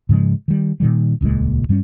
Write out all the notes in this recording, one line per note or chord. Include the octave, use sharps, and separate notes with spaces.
G#2 C#3 F3 G#3
D#3 G3
A#2 D#3 G3
D#1 C#2 A#2 G#3
G2 G3 G#3 C#4